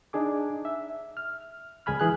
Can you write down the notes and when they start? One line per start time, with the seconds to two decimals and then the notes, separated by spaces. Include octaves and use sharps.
0.13 D4 D#4 G#4 D6
0.65 E5
1.17 F6
1.86 C#2 G#4 G#5 B5 F6
2.00 E3 G#4 F#6